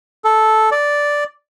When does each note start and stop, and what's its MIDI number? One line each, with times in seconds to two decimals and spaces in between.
0.24 0.70 69
0.72 1.24 74